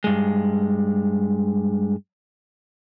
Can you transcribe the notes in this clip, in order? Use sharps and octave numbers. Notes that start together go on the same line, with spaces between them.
G2 G#3